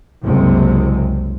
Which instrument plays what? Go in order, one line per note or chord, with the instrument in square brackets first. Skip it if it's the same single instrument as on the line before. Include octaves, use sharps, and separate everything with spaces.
[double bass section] F#1 C2 C3 G#3